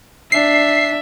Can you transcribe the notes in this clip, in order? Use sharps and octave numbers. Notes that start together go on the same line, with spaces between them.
D4 E5 C7